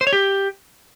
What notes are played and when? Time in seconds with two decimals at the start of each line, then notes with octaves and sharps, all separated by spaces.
0.01 C5
0.07 C#5
0.13 G4